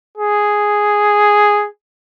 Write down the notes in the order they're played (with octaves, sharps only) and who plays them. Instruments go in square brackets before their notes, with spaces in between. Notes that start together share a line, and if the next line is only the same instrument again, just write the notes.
[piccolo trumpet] G#4